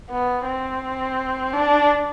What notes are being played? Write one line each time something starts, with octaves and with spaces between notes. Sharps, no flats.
B3
C4
D4